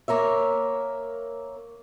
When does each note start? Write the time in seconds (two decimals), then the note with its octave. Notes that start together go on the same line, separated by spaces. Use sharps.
0.08 A#3 A#4 C#5 E5